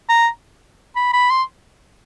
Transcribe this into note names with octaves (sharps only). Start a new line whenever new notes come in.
A#5
B5
B5
C6